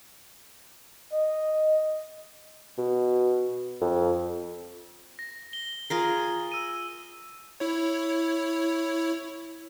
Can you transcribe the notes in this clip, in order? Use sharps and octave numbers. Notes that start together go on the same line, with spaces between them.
D#5
B2
F2
A#6
G7
F4 G#4 A#4
E6 D#7
E4 C#5